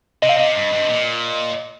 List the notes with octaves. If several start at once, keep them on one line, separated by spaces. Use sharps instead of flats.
C3 D#5
F5
C3 D#5
G2
G2
C3
A#2